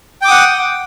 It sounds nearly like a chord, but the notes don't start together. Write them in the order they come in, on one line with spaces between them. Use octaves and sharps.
G5 D6 D#6 F#5